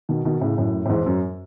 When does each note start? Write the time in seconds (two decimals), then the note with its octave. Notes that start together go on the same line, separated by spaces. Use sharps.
0.09 B2 D#3
0.25 B2 D#3
0.41 A2 C#3
0.58 F#2 A2
0.86 A2
0.89 E2 G#2
1.06 F#2